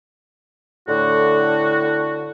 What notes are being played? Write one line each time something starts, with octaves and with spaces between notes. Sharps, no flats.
A2 D3 F#4